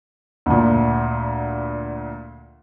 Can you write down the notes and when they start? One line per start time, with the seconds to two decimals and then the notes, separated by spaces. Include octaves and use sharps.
0.46 D2 A#2